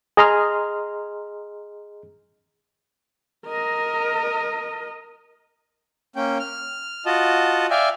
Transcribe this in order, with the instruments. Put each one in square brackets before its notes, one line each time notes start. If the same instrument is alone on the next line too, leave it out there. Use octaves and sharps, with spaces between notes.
[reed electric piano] G#4 D#5 A#5 C6 F6
[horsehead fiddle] A#4 D#5
[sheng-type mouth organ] A#3 C#4 G5
F6
F4 F#4 D#5 A5
D5 E5 F5 G5 G#5